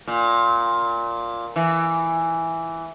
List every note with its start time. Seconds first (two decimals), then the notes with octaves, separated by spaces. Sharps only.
0.07 A#2
1.56 E3